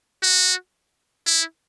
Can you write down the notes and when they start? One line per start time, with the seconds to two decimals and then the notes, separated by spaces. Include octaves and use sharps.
0.23 F#4
1.27 E4